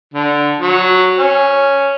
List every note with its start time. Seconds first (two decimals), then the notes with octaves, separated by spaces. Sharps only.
0.14 D3
0.61 F#3
1.19 C#4